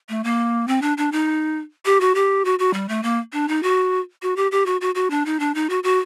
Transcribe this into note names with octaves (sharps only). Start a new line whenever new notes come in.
A3
A#3
C4
D4
D4
D#4
G4
F#4
G4
F#4
F#4
G3
A3
A#3
D4
D#4
F#4
F#4
G4
G4
F#4
F#4
F#4
D4
D#4
D4
D#4
F#4
F#4